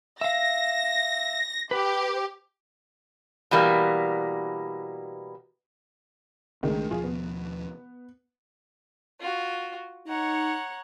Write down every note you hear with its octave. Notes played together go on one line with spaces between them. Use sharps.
E5 F5 A#6
G4 B4
B2 E3 G3 A#3
B1 D#3 G#3 A3 D4
D#2 B2 F3 F4 G#4
B3
F4 F#4
D#4 C#5 F#5 A#5